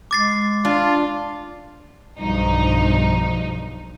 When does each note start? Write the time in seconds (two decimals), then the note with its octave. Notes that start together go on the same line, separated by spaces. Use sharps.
0.11 G#3 D6 A6 C7
0.65 D4 F4
2.18 B1 G2 F3 D#4